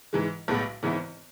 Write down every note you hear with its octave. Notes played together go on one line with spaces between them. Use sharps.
G#2 E3 G#3
B1 A2 G#3 B3
G#1 G#2 E3 B3 E4